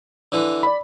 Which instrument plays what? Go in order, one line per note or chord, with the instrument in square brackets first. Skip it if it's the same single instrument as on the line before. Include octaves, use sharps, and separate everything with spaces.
[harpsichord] D3 E3
[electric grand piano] D5 B5